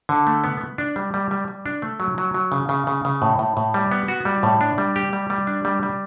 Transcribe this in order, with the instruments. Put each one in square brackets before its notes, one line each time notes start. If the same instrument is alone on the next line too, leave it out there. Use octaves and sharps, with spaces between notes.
[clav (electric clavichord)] D3
A3
B3
B3
D4
G3
G3
G3
G3
D4
A3
F#3
F#3
F#3
C#3
C#3
C#3
C#3
A2
A2
A2
G3
B3
F#4
G3
A2
D4
G3
G4
G3
G3
D4
G3
G3